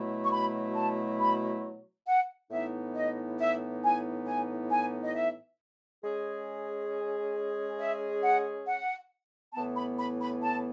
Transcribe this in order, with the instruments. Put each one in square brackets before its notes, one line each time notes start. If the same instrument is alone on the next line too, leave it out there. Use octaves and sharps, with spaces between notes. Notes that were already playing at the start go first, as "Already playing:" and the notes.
Already playing: [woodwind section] B2 F#3 A3 E4
[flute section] C#6
B5
A5
B5
F#5
[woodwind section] A2 E3 B3 D#4 [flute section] E5
[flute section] D#5
E5
G#5
G#5
G#5
D#5
E5
[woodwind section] G#3 C#4 G#4
[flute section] E5
F#5
F#5
[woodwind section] A2 E3 B3 [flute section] A5
[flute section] B5
B5
B5
A5